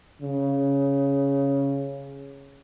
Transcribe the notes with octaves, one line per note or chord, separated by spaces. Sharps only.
C#3